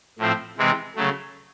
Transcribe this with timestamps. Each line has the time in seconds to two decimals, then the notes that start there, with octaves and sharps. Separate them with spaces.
0.19 A2 F3 A3 C4
0.58 C3 E3 G#3 C4
0.96 C#3 F#3 A3